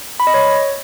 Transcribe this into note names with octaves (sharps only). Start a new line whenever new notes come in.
B5
D#5
C#5